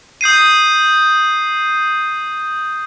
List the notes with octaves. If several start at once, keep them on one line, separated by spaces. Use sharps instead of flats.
D#6 G6 C7 D#7